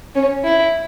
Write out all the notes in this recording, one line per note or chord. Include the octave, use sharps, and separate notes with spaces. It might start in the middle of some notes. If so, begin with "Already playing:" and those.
C#4
E4